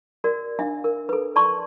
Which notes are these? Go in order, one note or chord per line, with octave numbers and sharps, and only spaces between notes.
F#4 A#4 D5
D4 E5 F5
A#4
A4 B4
D5 A5 C6 C#6